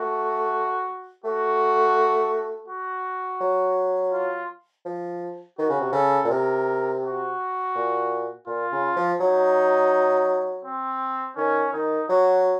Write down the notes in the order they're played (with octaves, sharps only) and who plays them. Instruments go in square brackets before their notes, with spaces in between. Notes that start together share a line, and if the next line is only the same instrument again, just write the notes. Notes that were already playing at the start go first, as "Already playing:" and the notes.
Already playing: [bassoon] A3 [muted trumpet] F#4
[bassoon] A3 [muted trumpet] F#4
[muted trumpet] F#4
[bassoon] F#3
[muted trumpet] F4
[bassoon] F3
[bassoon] D#3 [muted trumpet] F#4
[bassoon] C#3
C3
[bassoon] C#3 [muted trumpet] A4
[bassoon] A#2
[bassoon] C3 [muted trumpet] A#4
[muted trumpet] F#4
[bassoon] A#2
[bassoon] A#2 [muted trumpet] F4
[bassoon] C#3
F3
[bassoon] F#3 [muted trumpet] D#4
[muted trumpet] C4
[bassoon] D#3 [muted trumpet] C#4
[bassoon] D#3 [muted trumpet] D#4
[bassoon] F#3 [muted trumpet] F#4